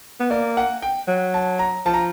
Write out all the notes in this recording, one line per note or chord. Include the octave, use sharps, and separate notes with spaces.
B3
A#3 D5
F#5
G5
F#3
A5
A#5
F3 A5
A#5